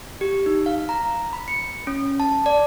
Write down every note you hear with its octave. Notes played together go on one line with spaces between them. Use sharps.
G4
D#4
F5
A#5
B5
C#7
C#4
A5
D5